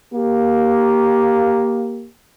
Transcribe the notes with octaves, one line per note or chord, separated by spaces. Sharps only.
A#3 G4